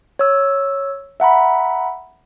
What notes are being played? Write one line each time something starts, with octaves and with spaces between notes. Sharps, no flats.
C#5 E6
E5 F#5 A#5 B5